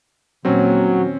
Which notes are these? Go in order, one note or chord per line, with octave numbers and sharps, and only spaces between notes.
A#1 D#2 F#3 C4 C#4